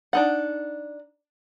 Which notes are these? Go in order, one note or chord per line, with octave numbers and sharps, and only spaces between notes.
D4 D#4 F#5